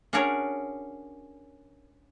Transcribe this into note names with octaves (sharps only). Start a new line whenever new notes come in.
C#4 D4 F#4 G#4 A#4 C#5